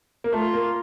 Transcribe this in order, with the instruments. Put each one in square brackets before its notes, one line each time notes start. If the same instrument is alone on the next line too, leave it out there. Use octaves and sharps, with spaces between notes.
[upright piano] A#3
[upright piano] A3 [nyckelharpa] F4
[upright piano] A#3